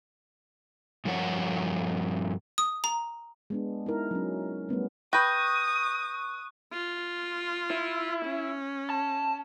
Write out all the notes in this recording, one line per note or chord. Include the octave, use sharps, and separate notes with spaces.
G2 F3 A#4 C#5 F#5
D#6
A#5
G#3 B3 D4
D#4 E4 A#4
F#3 C#4
G3 A3 B3 C#4
B4 G5 C#6 D#6 F#6 G6 A#6
F4
E4
C#4
A5